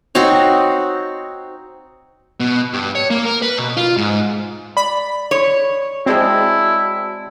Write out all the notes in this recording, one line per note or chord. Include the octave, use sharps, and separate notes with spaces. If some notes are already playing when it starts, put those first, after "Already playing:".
C4 D#4 F#4 C#5
B2
G2
C#5
A#3
A#4
B4
B2
F4
G#2
D5 B5
C#5
G#3 C4 E4 F#4 D5 A5